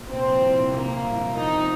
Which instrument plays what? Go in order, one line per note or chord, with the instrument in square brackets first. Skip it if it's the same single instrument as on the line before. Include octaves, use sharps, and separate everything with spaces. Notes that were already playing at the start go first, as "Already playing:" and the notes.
Already playing: [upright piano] A#2
[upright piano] C3 [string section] C4
[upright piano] F3
C2
C2
[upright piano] C3 [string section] A#3
[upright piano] F3
C2
C2
[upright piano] F3 [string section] D#4
[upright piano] C4